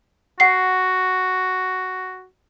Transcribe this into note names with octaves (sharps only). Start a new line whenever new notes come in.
F#4 F#5 C7